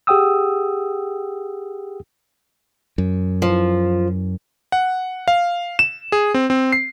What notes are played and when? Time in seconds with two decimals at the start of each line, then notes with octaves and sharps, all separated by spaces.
0.07 G4 G#4 F#5 G5 D#6 E6
2.98 F#2
3.42 F3
4.72 F#5
5.28 F5
5.79 E7
6.12 G#4
6.34 C4
6.50 C4
6.72 C7